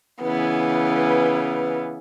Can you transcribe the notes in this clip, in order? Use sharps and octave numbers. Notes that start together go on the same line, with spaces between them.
C#3 E3 B3